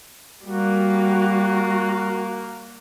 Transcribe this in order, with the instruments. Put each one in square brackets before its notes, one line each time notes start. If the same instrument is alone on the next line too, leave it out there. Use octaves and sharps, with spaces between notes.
[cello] G3 [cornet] A#3 [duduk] F#4